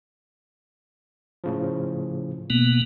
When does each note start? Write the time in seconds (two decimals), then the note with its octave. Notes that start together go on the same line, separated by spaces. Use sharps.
1.44 A2 C#3 F3
2.50 B2 A#3 B3